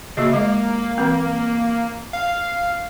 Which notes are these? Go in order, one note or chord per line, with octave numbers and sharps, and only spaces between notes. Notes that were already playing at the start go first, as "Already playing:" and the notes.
C#3 A#3 F#4 D#5
G#3 A#3
E3 C4
F5